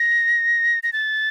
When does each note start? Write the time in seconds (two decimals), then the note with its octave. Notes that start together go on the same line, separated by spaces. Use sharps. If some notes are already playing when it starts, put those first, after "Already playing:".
Already playing: A#6
0.83 A#6
0.93 A6